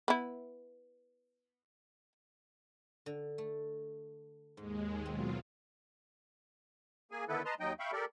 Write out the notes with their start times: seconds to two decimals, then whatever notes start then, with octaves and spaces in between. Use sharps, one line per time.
0.08 B3 E4
3.06 D3
3.38 A3
4.57 D#2 G#2 G#3
5.06 B2 F#3 C4 F4
7.11 A#3 G#4 G#5
7.28 D3 D#3 B3 E4 A4 B4
7.45 B4 D#5 A5 A#5 C6
7.60 D#2 F#3 D#4 D#5 G5
7.79 E5 F5 G5 B5 C#6
7.92 G4 A4 A#4 D5